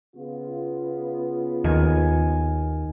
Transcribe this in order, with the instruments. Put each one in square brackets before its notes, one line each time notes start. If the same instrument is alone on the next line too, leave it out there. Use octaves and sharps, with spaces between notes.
[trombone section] C#3 B3 F4
[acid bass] D#2 [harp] D#3 G#5